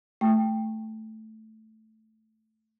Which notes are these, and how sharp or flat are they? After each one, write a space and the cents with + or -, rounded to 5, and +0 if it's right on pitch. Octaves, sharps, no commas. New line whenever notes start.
A3 +0 G5 +5 C#6 -20